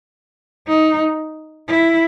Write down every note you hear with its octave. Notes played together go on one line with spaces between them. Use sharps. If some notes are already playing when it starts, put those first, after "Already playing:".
D#4
E4